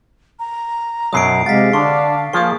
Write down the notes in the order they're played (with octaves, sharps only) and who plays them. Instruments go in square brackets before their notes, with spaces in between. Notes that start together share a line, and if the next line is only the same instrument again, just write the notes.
[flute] A#5
[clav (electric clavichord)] F#2 B2 F#3 [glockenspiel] D#6 C7 D7
[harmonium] C3 G#3 [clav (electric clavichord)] F#4 A#5 [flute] F5 [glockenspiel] A6 B6
[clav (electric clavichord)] D3 [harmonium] D4 [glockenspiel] C#6
[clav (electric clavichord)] F3 F4 G#4 [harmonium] A#3 [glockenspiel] C#6 D#6